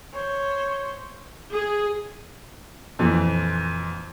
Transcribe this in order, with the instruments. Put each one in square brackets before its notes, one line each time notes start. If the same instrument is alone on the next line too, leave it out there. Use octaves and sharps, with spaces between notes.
[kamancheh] C5 C#5
[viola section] G#4
[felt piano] F2 A#2 E3